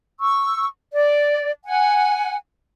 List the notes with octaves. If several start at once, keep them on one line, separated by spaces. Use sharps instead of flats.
C#6 E6
D5
F#5 G#5